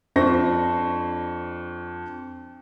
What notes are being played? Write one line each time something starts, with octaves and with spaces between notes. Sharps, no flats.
F2 D4 C5 C#6 A#6